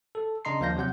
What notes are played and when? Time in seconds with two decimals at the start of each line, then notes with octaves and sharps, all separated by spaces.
0.15 A4
0.45 C#3 D4 D#5 A#5 C6 C7
0.60 D#2 F3 D4 F5 G6 A#6
0.76 C3 F#3 F#5 G6